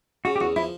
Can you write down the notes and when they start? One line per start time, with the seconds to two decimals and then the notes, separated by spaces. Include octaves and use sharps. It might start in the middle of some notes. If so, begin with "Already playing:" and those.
0.25 C#3 F#4
0.36 G4
0.41 E2 F#4
0.56 F3 E4